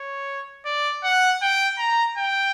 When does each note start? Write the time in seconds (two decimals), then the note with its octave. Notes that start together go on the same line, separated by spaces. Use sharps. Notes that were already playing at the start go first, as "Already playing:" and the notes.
Already playing: C#5
0.66 D5
1.04 F#5
1.42 G5
1.79 A#5
2.18 G5